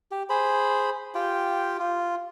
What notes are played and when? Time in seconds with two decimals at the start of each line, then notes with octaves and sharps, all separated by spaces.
0.11 G4
0.30 G#4 C5 B5
1.14 F4 G4 G5
1.79 F4